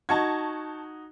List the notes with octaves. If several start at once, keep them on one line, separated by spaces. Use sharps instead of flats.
D#4 F#4 A5 C#6 G#6